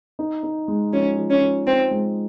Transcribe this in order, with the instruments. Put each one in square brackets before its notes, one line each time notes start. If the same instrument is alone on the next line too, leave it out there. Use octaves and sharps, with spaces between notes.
[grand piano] D#4
D#4
G#3
[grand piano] F3 [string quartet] C#4
[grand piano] F3
[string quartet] C#4
[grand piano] F3
[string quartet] C4 [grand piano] D#4
[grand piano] G#3